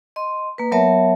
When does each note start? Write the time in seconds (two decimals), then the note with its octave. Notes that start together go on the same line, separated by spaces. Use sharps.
0.16 D#5 C6
0.58 A#3 B4
0.72 F#3 B3 A#4 C#5 E5 A5